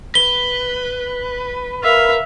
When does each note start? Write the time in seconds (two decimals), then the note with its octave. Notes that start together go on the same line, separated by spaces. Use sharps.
0.15 B4 G7
1.83 A#4 E5 F5